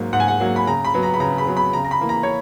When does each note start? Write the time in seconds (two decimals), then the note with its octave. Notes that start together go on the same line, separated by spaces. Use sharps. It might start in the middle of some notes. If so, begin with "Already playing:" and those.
Already playing: G#2 F#3 A#3
0.13 G#2 F#5
0.20 G#5
0.28 F#5
0.40 F#3 A#3
0.56 B5
0.67 C#3 A#5
0.85 B5
0.94 F#3 B3
1.03 A#5
1.14 B5
1.20 C#3 A#5
1.38 B5
1.47 F#3 B3
1.57 B5
1.73 C#3 A#5
1.84 A#5
1.91 B5
2.01 E3 A#3
2.09 A#5
2.23 C#5